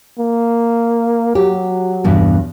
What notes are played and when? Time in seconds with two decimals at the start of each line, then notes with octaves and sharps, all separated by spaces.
0.19 A#3
1.35 F#3 G4
2.04 E2 G2 B2